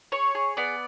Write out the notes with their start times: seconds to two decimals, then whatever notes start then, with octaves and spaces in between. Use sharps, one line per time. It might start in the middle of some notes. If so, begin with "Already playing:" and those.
0.12 G#4 C#5
0.35 G#4
0.57 B3 D5